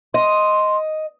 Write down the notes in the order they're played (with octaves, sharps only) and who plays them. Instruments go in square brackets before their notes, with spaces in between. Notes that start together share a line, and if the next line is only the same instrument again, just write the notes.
[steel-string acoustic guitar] D#5 [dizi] C6